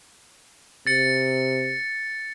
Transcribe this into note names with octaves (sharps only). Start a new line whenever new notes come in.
C3 A6 C#7